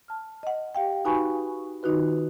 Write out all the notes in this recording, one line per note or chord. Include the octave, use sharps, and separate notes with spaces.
A5 F6
D#5 F#5
G4 F5 G5
D#4 F#4 B4 G#5 B5 C#6
D#3 D#4 F4 F#4 B4